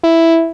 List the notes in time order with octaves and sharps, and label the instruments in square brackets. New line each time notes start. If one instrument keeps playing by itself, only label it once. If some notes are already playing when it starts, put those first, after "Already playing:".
[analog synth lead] E4